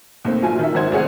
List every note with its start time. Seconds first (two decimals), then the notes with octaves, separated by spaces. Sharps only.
0.25 D#2 A3 C4
0.42 A#1 F#3 F4 G#5
0.59 D#3 E5
0.74 G#1 D#3 F#4 C5 G#6
0.92 C2 A3 C4 G#4 C#5 F#5